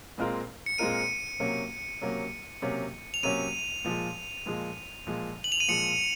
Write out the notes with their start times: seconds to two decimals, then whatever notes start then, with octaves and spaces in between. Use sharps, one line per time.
0.18 A#2 G#3 C4 F4 A#4
0.66 C#7
0.78 A#2 G#3 C4 F4 A#4 D#7
1.40 C3 F#3 A#3 C#4
2.01 C3 F#3 A#3 C#4
2.62 C3 F#3 A#3 C#4
3.14 F7
3.23 C3 F#3 A#3 C#4 D#7
3.85 A#2 F3 G#3
4.46 A#2 F3 G#3
5.07 A#2 F3 G#3
5.44 F#7
5.52 F7
5.60 D#7
5.68 A#2 F3 G#3 C#7